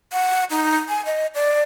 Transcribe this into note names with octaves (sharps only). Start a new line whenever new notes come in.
F#5
D#4
G#5
D#5
D5